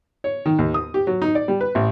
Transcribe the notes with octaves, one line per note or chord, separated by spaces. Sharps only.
C#5
D#3
D#2
D#6
G4
F#3
D#4
D5
G3
B4
A1